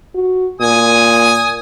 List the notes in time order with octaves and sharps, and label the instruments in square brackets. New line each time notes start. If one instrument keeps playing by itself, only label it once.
[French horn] F#4
[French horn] A#2 [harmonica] G#5 D#6